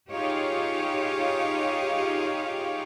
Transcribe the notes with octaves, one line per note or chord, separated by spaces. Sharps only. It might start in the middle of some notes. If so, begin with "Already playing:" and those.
D#4 F4 G4 G#4 C#5 F5